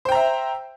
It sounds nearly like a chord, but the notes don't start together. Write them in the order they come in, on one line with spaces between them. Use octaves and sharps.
C5 G5 A#5 E5